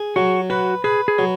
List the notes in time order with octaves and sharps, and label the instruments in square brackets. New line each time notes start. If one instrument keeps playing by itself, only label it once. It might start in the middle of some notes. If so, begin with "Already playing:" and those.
Already playing: [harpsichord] G#4
[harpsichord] F#3 [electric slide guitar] F#4
[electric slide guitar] F#4 [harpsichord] B4
[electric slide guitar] G#4 [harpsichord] B4
[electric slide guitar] G#4
[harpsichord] F#3